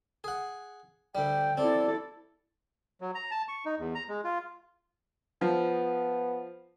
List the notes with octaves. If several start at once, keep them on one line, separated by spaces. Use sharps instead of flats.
G#4 F#5
D2 G3 G5
C4 E4 A4 D5
F#3
A#5
A5
C#6
D#4
E2
A#5
G#3
F4
F3 B3